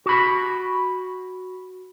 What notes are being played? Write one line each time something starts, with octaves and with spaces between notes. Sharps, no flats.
F#4 B5